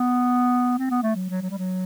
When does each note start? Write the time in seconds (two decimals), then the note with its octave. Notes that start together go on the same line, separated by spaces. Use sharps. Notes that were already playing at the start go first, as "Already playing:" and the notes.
Already playing: B3
0.79 C4
0.90 B3
1.03 A3
1.16 F#3
1.30 F#3
1.42 F#3
1.51 G3
1.58 F#3